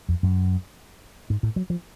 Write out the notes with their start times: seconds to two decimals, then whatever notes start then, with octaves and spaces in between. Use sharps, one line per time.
0.09 F2
0.23 F#2
1.30 G#2
1.43 A2
1.56 F#3
1.70 F3